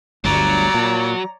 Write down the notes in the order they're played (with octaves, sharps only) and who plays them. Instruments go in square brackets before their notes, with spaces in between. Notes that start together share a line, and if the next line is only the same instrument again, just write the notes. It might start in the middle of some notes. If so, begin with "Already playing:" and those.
[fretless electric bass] G1 D2 G2 [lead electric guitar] F#3 [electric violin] C#5 D5 [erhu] A#5
[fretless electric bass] A#2